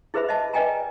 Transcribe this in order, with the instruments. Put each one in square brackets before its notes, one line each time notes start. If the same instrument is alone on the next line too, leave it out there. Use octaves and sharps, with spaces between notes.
[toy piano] E4 G#4 B4 C5 E5 B5
D#5 E5 A5
B4 D5 D#5 G5 G#5 A#5